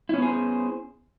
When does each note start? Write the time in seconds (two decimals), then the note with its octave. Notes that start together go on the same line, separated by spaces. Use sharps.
0.09 E4
0.14 C#4
0.18 B3
0.22 G#4
0.27 C5